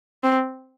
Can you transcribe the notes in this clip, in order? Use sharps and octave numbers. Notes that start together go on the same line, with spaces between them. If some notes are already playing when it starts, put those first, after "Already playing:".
C4